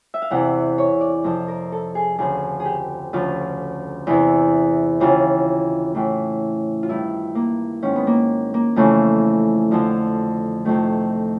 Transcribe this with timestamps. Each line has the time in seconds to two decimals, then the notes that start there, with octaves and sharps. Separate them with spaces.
0.14 E5
0.22 F5
0.30 E2 C3 E3 F#5
0.78 C#5
1.01 D5
1.24 F2 C3 F3
1.48 A#4
1.72 A4
1.95 G#4
2.18 D2 C#3 F3 G#4
2.60 G#4
2.65 G4
3.13 D2 C#3 F3 F4
4.07 E2 C3 E3
5.00 D#2 C#3 E3 F4
5.95 A2 E3
6.83 F4
6.89 G2 D#3 E4
7.35 A#3
7.82 G#2 D#3 C#4
7.96 B3
8.07 A#3
8.54 A#3
8.76 F2 C#3 E3 A3
9.71 F2 D3 F3
10.65 F2 C3 D#3 A3